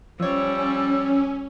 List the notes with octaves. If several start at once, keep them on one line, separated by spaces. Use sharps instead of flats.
F3 G3 C#4 C#5 E6